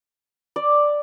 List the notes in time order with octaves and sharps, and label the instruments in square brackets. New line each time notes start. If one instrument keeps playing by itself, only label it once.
[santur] D5